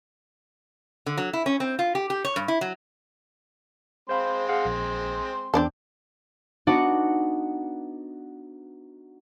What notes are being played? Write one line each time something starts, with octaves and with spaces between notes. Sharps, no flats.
D3
F#3
E4
C#4
C4
F4
G4
G4
C#5
G2
E4
F#3
G#3 C4 C5 F5 B5 C6
G#4 F5 F#5
A#1
E2 C4 D4 A4 D6 G6
B3 D4 D#4 F#4 D5 F#5